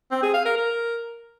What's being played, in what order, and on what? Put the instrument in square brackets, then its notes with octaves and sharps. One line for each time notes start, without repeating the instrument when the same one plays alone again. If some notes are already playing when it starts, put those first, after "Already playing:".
[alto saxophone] C4
G#4
F5
A#4
A#4